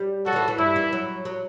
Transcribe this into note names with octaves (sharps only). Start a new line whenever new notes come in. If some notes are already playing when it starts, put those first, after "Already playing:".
Already playing: G3
F#3 F#4 A4
D3
E3
E3
G2 E4
E3
F#3
F#3